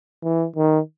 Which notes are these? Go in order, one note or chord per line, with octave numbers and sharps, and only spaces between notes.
E3
D#3